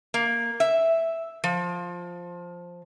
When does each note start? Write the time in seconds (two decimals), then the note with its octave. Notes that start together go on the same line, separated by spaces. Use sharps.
0.14 A#3
0.60 E5
1.44 F3